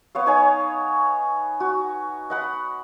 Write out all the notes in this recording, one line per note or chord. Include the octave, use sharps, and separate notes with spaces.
B3 C#5 F5
D#4 C#5 G#5
F#4
D#5 F#5 B5